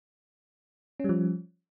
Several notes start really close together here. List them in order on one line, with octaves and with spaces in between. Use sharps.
C#4 G3 F3